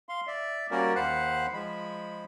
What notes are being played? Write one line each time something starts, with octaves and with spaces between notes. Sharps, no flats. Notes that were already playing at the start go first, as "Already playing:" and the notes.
F5 C6
D5 E5
G3 A#3 C#4 F#4 A#4 D5
D#2 C5 F5 F#5 B5 F#6
F3 G#3 B5